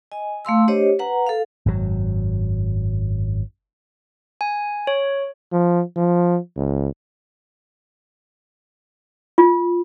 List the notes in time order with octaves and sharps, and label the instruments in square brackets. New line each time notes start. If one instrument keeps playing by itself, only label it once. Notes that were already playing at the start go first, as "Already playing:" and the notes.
[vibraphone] D#5 G#5
A3 F5 C6 E6
D4 G4 C5 C#5 D#5
B4 F#5 A#5
A4 F5
[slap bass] G#1 F#2 A2 F#3
[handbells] G#5
C#5
[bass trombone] F3
F3
C#2
[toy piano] F4